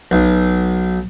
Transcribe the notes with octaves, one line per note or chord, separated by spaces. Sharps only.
B1